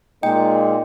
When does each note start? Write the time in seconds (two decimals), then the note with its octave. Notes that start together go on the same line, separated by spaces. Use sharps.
0.23 A#2 G#3 A#3 D#4 G5